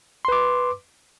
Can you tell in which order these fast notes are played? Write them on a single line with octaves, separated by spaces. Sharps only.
C6 B4 D6